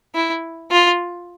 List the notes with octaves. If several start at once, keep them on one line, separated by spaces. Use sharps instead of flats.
E4
F4